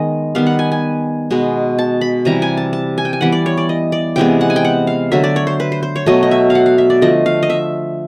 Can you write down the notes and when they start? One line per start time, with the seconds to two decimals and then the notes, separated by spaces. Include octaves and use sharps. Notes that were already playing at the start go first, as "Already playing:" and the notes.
Already playing: D#3 G#3 B3 D#5
0.35 D#3 G3 B3 F5
0.47 F#5
0.59 G#5
0.72 G#5
1.31 B2 G#3 B3
1.79 A5
2.01 B5
2.25 C3 E3 G3 A#5
2.42 G#5
2.57 A5
2.73 A5
2.98 G#5
3.05 G5
3.13 G#5
3.21 E3 G3 B3 F#5
3.32 D5
3.46 C#5
3.57 D5
3.69 D#5
3.92 D5
4.16 C3 E3 G#3 B3 G5
4.41 F#5
4.50 G#5
4.56 G5
4.65 F#5
4.87 F5
5.12 D3 F#3 A3 E5
5.24 D5
5.36 C#5
5.47 C5
5.60 B4
5.72 C5
5.83 C5
5.96 C#5
6.06 B2 F#3 A3 D#5
6.23 D#5
6.31 E5
6.50 F5
6.55 F#5
6.66 F5
6.78 E5
6.90 D5
7.01 D3 F3 A3 D#5
7.26 F5
7.43 D#5
7.50 E5